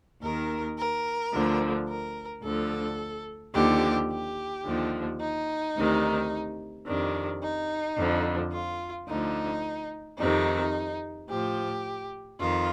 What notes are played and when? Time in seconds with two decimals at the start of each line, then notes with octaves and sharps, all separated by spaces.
0.22 D#2 D#3 A#4
0.78 A#4
1.33 D2 D3 F3
1.89 A#4
2.44 D2 D3 F3 A4
3.55 D#2 D3 F3 G4
4.10 G4
4.65 D#2 D3 F3
5.21 D#4
5.76 D2 C3 D#3
6.87 F2 C3 D#3 D4
7.42 D#4
7.97 F2 D3 F3
8.53 F4
9.08 D2 D3 F3 D#4
10.18 F2 C3 D#3 D#4
11.29 A2 F3 G4
12.40 F2 D#3 F4